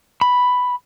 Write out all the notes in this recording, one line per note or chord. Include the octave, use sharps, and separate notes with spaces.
B5